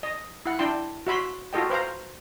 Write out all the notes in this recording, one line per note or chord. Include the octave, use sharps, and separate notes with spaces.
D#5
E4 F#5
D4 E4 G5 C6
F#4 E5 B5 C6
F4 F#4 A4 D#5 G5
B4 C5 F5 A#5